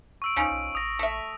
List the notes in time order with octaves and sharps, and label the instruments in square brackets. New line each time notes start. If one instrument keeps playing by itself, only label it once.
[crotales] C#6 E6 D7
[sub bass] D2 [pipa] F3 C#4 D#4
[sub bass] B1
[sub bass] A1 [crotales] D#6 A#6
[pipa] A3 E5